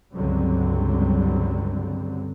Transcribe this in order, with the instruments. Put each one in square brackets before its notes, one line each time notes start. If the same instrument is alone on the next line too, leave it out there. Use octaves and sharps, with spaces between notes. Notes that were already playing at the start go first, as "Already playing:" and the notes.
[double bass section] C#2 G2 D3 F#3 G3 C4